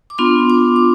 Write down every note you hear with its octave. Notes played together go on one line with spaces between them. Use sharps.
D6
B3 D4 F4 C6
D6
D6